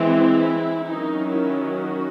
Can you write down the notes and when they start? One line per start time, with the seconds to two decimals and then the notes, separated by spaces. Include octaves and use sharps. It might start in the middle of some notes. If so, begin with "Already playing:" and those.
Already playing: E3 G#3 C4
0.09 E4
0.89 D#3 F#3 C#4 D#4
1.30 E4
1.70 F#4